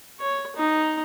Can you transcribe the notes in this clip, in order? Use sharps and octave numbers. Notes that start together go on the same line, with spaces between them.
C#5
D#4